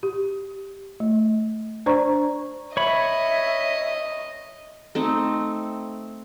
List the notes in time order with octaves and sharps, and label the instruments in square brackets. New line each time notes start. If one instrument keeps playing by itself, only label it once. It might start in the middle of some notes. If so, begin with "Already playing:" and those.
[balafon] G4
A3
D4 C5 D5 A#5 C#6
[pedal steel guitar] C#5 B5 [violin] D#5 [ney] E5
[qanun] A3 C4 D#4